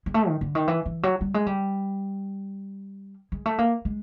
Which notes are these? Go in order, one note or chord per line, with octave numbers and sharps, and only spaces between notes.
G#3
A3
D#3
D3
D#3
E3
E3
F#3
G3
G#3
G3
G#3
A3
A#3
G#3